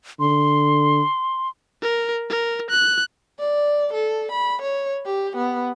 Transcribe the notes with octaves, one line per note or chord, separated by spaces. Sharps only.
D3 C6
A#4
A#4
F#6
D5
A4
B5
C#5
G4
B3